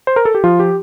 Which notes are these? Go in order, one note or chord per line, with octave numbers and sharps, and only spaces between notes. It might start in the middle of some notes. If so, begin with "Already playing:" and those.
C5
A#4
A4
G4
F3 F4
G4